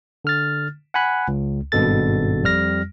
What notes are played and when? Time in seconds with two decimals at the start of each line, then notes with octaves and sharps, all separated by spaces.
0.25 D3 F6 A6
0.94 F#5 G#5 B5 F#6
1.28 C#2
1.72 G#1 G2 B2 A4 A6
2.44 F2 G3 F6 A#6